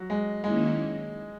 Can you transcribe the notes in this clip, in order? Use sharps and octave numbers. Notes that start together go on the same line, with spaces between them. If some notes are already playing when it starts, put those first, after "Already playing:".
Already playing: F#3
G#3
D#3 G#3 A#3 C#4 E4